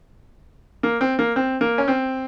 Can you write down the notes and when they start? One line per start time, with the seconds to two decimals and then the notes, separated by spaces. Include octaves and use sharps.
0.83 A#3
1.01 C4
1.19 A#3
1.36 C4
1.61 A#3
1.78 C#4
1.88 C4